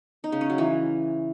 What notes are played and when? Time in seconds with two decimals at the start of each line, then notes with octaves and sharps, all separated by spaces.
0.24 D#4
0.32 C#3
0.41 C#4
0.50 F#3
0.58 E3